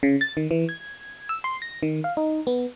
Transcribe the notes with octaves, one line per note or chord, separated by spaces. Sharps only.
C#3
A6
D#3
E3
G#6
E6
C6
A#6
D#3
F5
D#4
B3